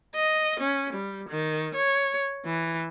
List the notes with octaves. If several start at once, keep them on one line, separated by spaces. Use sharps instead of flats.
D#5
C#4
G3
D#3
C#5
E3